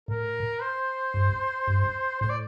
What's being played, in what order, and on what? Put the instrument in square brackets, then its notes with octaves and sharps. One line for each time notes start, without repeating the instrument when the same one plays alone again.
[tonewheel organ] A2 [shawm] A#4
[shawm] C5
[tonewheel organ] G2
G2
[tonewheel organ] A2 [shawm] C5
[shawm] D5